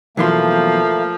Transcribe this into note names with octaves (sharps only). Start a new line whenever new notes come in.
B1 E3 F3 A3 A#3 C6